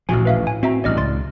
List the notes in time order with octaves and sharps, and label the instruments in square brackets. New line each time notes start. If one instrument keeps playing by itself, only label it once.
[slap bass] A1 D2 F3 [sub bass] A#2 [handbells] A3 F#4 G#5
[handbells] B4 E5 F5
[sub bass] A2 [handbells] G#5
[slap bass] C4 [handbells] F#4 E5 A#5
[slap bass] A1 G2 [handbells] D5 D#5 F6
[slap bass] C#2 [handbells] D5 C6 A6